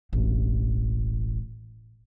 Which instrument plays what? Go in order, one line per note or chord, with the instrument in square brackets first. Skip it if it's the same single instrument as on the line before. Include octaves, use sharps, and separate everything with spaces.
[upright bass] E1 A1